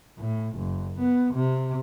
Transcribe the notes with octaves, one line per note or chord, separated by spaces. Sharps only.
A2
F#1
B3
C3